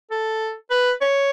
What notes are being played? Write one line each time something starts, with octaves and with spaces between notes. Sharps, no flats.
A4
B4
C#5